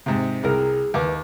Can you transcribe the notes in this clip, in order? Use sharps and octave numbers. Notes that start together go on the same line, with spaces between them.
G#2 C3
C2 G#4 A#4
D#2 B4 D6